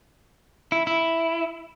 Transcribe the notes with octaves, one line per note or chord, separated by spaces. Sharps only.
E4
E4